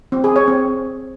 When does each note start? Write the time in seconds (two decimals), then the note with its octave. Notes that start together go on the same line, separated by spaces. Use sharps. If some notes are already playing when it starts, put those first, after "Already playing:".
0.12 C4
0.24 G#4
0.36 C#5
0.48 C4